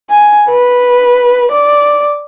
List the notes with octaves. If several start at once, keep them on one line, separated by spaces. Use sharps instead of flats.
G#5
B4
D5